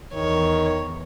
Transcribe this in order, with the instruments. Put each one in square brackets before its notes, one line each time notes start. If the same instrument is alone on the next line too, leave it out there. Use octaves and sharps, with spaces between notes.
[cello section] E2 [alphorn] D#3 [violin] C#5